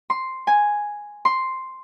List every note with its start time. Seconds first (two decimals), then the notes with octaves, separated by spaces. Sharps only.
0.10 C6
0.47 G#5
1.25 C6